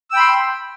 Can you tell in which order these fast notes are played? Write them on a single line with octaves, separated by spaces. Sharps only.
E6 G5 B5 C6